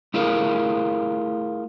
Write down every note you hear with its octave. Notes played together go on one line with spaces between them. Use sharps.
A3 E4 F4 G#4 A#4